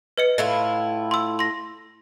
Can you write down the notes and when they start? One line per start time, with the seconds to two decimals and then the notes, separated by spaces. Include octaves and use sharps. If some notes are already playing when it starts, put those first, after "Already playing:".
0.18 B4 D#5 C#7
0.38 A2 E4 F4
1.11 C6 E6
1.39 C6 A#6